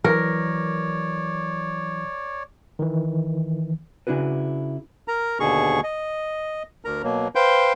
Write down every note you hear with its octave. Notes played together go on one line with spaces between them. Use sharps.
E3 F#3 A#4 C#5 D5
D#3 E3
C#3 D4 E4 F#4 B4
A#4 A#5
D#2 B2 D3 G#4 C#6
D#5
D2 A#4 A#5
B2 F#3 A#3
B4 C5 F5 G5 C6 G6